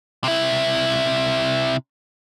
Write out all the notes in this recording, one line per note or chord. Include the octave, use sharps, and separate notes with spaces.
C3 E4